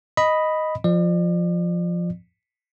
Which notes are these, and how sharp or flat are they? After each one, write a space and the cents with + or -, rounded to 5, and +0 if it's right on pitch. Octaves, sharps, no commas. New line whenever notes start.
D#5 +0 B5 +0
F3 +0 D5 +40